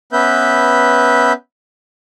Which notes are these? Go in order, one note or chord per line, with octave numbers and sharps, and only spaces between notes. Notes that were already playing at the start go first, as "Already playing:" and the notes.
B3 C#4 B4 E5 G6